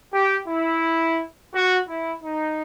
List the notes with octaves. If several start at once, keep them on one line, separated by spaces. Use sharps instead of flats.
G4
E4
F#4
E4
D#4